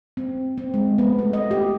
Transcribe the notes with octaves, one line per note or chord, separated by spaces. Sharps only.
C4
C4
G#3
B3
A3
D#5
G4